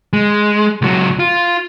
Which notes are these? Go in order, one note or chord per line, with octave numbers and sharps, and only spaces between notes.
G#3
C#2 F#3
F4